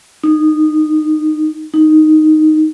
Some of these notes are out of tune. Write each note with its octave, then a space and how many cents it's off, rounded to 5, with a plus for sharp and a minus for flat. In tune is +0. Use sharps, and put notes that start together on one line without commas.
D#4 -20
D#4 -5